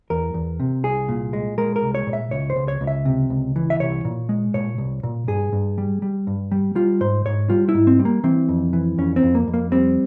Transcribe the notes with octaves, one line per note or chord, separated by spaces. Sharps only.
E2 A#4
E2
C3
C2 G#4
A#2
G#3
G#3 A#4
A#4
C2
C#5
A#2
E5
C#2 C#5
C5
C#2
C#5
C#2
E5
C3
C#2
E3
E5
C2 C#5
A#2
G#3
A#2 C#5
C2
A#2
G2 G#4
G2
G3
G3
G2
G3
G3 F4
G#2 C5
G#2 C#5
G3 F4
E4
G#2
C4
G3
A#3
E3 C4
F2
E3
F2 C#4
C4
F2
A#3
F2
A#3
G3 C4